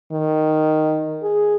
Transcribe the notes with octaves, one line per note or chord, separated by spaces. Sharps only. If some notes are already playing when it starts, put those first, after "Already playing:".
D#3
G#4